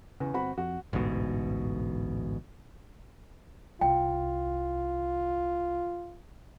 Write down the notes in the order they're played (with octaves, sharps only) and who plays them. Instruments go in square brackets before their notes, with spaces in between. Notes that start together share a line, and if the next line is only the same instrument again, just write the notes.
[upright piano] E2 [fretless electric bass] C#3
[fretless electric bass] G1 C4 [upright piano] F#4 B5
[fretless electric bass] F2 [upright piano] F#4
[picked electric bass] A1 D2 G#2 B2
[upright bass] C2 [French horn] F4 [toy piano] G5